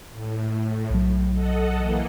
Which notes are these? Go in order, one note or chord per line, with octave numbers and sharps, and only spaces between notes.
A2
B1 F#3
A4 D#5 F#5
E3 A#3